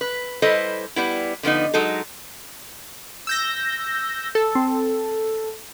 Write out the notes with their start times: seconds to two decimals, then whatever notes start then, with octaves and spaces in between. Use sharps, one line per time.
0.01 B4
0.42 G3 E4 A4 B4 C5 D#5
0.96 G3 B3 E4
1.43 D3 F3 B3 D#4
1.74 F#3 G#3 D#4 A4
3.27 E6 G6 A#6
4.35 A4
4.55 C4